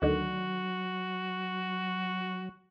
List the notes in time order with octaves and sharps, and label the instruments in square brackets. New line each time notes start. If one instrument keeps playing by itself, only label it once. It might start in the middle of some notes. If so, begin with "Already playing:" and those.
[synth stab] D2 D3 D#3 [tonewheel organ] F#3 [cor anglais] F#4